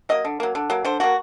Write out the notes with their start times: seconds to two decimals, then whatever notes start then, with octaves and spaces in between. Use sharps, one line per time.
0.09 F#3 A#3 D#5
0.25 D3
0.40 F#3 A#3
0.55 D3
0.70 F#3 A#3
0.85 D3 C5
1.00 F#3 A#3 F#4